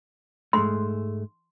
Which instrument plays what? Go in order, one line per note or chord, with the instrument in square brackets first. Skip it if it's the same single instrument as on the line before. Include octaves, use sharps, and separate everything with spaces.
[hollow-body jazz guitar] G#2 G#3 A3 [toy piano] C6